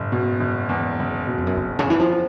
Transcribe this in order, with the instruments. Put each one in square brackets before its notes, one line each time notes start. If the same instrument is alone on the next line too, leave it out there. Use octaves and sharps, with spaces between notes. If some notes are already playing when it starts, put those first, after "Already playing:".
Already playing: [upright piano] F#1 [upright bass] G#2
[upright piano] B2
F#1
E2
F#1
B2
[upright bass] F2
F#2
[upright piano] F#1 [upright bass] G2
[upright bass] C#3
[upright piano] E2
[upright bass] E3
F3